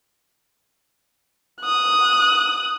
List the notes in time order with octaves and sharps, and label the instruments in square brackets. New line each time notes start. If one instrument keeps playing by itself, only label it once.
[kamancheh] D#6 F#6